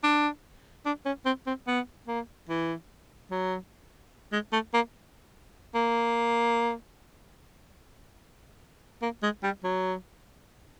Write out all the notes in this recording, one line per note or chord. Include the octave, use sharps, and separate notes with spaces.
D4
D4
C#4
C4
C4
B3
A#3
E3
F#3
G#3
A3
A#3
A#3
A#3
G#3
G3
F#3